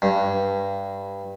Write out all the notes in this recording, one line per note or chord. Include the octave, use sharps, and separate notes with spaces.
G2